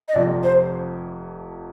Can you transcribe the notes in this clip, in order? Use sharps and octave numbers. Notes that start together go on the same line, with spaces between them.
D#5
F1 F2 C3 F3 D5
C5